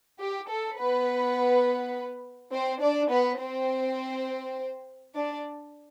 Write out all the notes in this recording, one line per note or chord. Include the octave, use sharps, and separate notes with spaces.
G4
A4
B3 B4
C4 C5
D4 D5
B3 B4
C4 C5
D4 D5